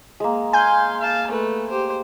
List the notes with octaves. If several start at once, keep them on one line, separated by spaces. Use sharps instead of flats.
G#3 A#3
F5 G#5 C6 G6
F5 A5
A3 B4
G4 C5